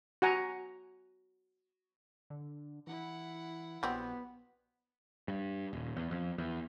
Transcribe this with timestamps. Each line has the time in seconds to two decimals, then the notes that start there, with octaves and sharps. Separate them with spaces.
0.22 F#4 F#5 G#5 A#5
2.30 D3
2.87 E3 E4 F#5
3.83 A#1 F#3 G3 B3 C4
5.28 G2
5.73 D#1
5.97 E2
6.11 F2
6.38 E2